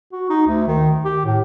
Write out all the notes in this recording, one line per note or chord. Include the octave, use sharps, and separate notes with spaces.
F#4
D#4
D2
D#3
G4
A2